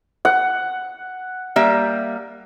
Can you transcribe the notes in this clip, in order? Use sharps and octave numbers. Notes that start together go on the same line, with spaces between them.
F#5
G3 A#3 E5